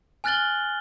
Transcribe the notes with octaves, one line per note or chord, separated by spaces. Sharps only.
G#5 F6 F#6 A6 F#7 G7